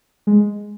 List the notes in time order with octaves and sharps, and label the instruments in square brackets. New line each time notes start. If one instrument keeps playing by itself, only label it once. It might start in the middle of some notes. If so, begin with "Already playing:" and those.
[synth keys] G#3